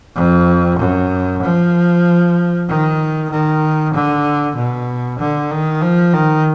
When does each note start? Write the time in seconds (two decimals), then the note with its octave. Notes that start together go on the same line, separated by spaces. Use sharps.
0.16 F2
0.79 F#2
1.43 F3
2.68 D#3
3.30 D#3
3.94 D3
4.56 B2
5.20 D3
5.51 D#3
5.82 F3
6.13 D#3